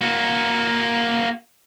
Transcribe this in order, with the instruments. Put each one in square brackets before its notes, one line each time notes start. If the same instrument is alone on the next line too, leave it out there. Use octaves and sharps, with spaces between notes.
[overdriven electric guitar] A#3 F#4